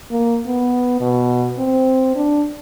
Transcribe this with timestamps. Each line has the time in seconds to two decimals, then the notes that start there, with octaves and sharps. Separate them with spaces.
0.11 A#3
0.46 B3
1.01 B2
1.58 C4
2.15 D4